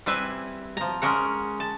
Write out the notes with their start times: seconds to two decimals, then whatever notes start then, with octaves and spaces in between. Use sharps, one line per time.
0.06 G3 C4 E4 B4 E5 G#5
0.77 F3 A#5
1.02 G#3 C#4 A#4 F#5
1.60 A5